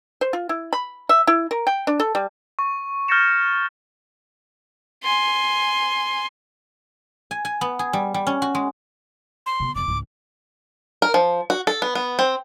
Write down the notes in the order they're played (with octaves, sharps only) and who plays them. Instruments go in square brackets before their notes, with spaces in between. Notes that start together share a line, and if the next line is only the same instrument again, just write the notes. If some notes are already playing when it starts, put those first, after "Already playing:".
[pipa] C5
F4
E4
B5
E5
E4
A#4
G5
D4
A4
G3
[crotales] C#6
F6 G6 A6 A#6 C#7 E7
[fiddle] G#5 C6
[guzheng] G#5
G#5
B3
G#4
G3
G3
C#4
F#4
G#3
[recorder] C6
[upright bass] C3 B3
[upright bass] F2 C3 [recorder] D6
[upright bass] C#2 G#2
[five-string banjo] A#4
F3
F#4
A4
B3
B3
C4